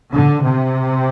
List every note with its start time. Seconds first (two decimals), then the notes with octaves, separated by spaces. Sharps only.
0.13 D3
0.42 C3